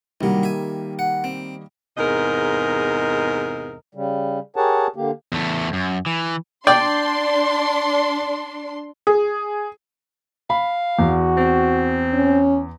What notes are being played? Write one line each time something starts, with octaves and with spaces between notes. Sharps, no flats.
C2 D#3 F#3 G3 A#3
E5 G#5
F#5
C4
E2 G#2 C3 A#4 D#5
C#3 G3
G4 G#4 A#4 C#5 F#5 A5
D3 A#3 G4
E2 A3
F#2
E3
D4 D5 G5 C6
G#4
F5 B5
E2 F#4
C4
C#4